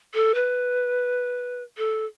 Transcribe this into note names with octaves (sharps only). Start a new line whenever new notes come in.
A4
B4
A4